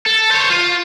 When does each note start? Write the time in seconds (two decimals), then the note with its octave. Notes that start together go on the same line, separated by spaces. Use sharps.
0.06 A4
0.31 C5 C#5
0.50 F4